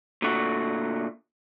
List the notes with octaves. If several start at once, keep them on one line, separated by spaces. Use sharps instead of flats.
A#2 D3 A3 F#4